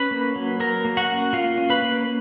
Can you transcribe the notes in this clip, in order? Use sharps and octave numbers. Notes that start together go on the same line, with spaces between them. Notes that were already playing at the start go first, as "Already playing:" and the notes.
Already playing: C#4 B4 B5
A#3
F#3
F#3 A#4 A#5
A#3
F#4 F#5
C#4
A#3 F4 F5
C#4
B4 B5
A#3